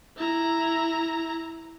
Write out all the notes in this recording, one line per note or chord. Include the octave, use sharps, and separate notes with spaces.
E4 A#5